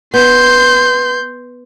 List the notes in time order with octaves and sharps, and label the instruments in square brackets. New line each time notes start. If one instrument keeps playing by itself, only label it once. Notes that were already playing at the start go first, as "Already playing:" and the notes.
[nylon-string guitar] B3 [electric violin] C6 G6